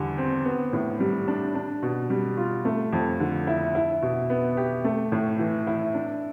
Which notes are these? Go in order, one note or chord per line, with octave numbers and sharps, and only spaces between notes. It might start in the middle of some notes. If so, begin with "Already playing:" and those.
Already playing: E2 D3 G3
C4
B3
A2
G3
D4
D4
B2
G3
F4
A3
F2
D3
E4
E4
B2
B3
G4
A3
A2
E3
E4
D4